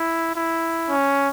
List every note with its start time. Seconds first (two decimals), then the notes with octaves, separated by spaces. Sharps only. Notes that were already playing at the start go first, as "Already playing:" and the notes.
Already playing: E4
0.35 E4
0.90 C#4